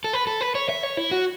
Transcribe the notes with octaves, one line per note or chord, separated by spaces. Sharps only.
A4
B4
A4
B4
C#5
E5
C#5
E4
F#4